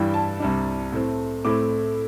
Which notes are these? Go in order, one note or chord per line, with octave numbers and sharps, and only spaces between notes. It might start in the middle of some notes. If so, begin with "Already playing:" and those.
Already playing: G2 E3 G3 E4 G5
A5
C2 C3 G3 D4
A2 A3 C4
A2 A3 C4 E4 D6